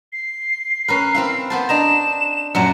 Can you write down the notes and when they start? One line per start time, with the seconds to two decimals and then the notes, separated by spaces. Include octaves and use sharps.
0.13 C7
0.88 C#4 A#4 B4
1.15 C4 E4 F5
1.50 B3 C5 A5
1.69 D4 D#5 A#5 E7
2.55 F#2 A#2 F#3 C#7